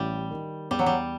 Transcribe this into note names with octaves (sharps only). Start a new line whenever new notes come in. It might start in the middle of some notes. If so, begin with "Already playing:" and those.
Already playing: A1 G3
D#3
E2 G3
F#3
G3